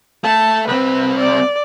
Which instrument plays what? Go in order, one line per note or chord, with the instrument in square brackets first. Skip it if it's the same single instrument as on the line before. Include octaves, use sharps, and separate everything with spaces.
[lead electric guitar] A3 [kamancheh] A5
[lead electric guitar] C2 C4 [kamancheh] B4
[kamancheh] D5